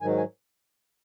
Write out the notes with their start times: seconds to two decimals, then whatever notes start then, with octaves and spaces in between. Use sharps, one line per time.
0.01 G#2 D#3 F#3 G#5
0.17 G#5